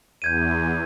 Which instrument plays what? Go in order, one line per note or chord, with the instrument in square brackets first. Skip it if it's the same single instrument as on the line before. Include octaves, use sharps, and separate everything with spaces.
[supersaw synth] E2 [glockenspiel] G6 G#6 D#7